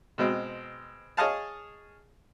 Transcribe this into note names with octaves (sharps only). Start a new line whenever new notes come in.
B2 G#3 C4
G#4 C#5 D#5 F5 A5